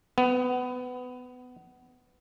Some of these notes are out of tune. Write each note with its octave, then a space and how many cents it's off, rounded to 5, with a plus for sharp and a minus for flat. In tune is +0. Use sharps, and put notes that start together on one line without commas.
B3 +20